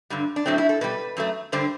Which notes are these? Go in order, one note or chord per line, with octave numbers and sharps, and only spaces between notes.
G2 D3 G3
D4
A2 F#3 A3 C4
E4
A4
B2 G3 B4
F#2 F#3 A3
G2 D3 G3 C5